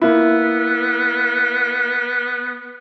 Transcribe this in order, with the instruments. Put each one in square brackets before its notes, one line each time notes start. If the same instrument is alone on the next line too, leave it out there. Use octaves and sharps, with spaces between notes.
[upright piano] A#3 E4 [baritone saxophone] B3